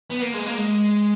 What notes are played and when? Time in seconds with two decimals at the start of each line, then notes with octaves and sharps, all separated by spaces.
0.11 B3
0.23 A#3
0.35 G#3
0.47 A#3
0.58 G#3